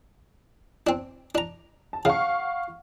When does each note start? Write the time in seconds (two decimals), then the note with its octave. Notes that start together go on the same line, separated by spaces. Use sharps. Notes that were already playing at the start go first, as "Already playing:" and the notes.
0.87 C4 D4
1.35 D4 A#5
1.93 A5
2.05 C#3 F5 F#5 C#6